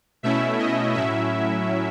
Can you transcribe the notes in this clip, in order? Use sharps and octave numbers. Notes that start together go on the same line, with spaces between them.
B2 A3 C#4 E4 E5
D#5
A2 F#3 C#4 E4 E5